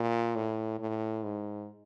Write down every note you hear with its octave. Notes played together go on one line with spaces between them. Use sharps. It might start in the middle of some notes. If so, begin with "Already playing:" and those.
Already playing: A#2
A2
A2
G#2